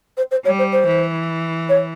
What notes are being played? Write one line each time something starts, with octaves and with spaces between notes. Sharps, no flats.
C5
C5
G3 C#5
C5
C5
E3
C#5